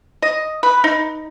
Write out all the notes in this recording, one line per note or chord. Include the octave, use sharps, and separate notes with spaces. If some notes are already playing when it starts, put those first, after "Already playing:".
D#5
B4
D#4